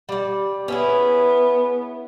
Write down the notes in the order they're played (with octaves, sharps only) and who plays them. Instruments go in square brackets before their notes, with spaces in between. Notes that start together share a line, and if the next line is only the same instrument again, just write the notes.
[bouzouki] G3 D5
[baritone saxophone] B3 [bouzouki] C#4 E4 G#4